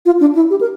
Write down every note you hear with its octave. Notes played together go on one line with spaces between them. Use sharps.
F4
D4
E4
G4
A#4